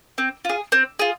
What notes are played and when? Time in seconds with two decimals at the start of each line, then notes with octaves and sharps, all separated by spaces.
0.18 C4
0.45 F4 G#4
0.72 C4
0.99 F4 G#4